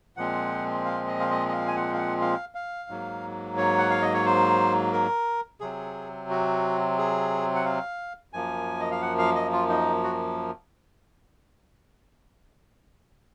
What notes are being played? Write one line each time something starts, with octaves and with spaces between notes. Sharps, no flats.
A#2 F3 G#3 C4 F#5
F5
D#5
F5
D#5
D#5
F5
G#5
F#5
F5
F#5
F5
F5
G#2 F#3 A#3
C#5
F#5
F5
D#5
C#5
C5
A#4
C3 F#3 C4 G#4
F#4
G#4
F#5
F5
F#2 F3 A#3 G#5
D#5
F5
F#5
F5
D#5
F4
D#4
F#4